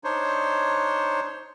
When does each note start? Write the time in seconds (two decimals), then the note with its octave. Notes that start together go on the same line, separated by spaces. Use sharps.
0.04 D4 D#4 C5 C#5